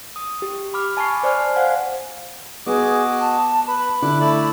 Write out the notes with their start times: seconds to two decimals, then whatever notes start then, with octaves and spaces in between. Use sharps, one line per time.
0.16 D#6
0.42 G4
0.74 B5 D6 F6
0.97 G#5 A5 B5 C#6 C7
1.23 C5 D5 G#5 F6
1.56 C5 F5 F#5 G#5
2.66 B3 F#4 G#4 D#5 D6
3.21 A5
3.68 B4 B5
4.02 D3 E4 D6 F#6
4.20 A3 E4 D5